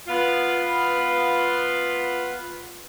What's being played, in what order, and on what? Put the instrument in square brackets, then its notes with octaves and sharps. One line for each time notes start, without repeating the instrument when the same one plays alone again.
[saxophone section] B3 F4